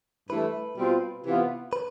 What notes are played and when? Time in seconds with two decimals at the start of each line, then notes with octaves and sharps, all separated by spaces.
0.30 G2 E3 A3 B4
0.78 B2 G3 C4 F4
1.25 C3 E3 B3 F4
1.73 B4